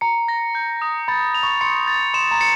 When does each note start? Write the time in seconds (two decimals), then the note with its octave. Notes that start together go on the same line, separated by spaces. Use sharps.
0.01 A#5 C#7
0.28 A#6
0.55 G6
0.82 D#6
1.08 B5 A6
1.34 F7
1.43 C#6
1.61 C6 C#7
1.87 A6
2.14 C6 E7
2.31 A#5
2.41 C#7